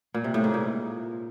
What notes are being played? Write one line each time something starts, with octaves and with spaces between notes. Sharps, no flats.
A#2
C3
A2
G#2
A#2